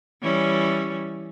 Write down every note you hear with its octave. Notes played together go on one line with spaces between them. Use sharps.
E3 G3 C#4